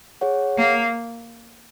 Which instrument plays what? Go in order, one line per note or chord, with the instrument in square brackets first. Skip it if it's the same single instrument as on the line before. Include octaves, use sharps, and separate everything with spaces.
[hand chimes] G#4 C#5 F#5
[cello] A#3